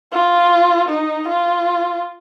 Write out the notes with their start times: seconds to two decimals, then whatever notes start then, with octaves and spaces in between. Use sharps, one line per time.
0.12 F4
0.89 D#4
1.28 F4